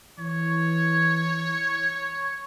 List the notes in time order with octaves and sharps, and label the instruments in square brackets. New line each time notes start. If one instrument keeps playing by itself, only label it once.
[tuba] E3 [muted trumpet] C#5